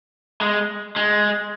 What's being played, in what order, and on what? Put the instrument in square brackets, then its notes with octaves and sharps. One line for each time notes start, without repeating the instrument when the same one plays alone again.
[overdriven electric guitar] G#3
G#3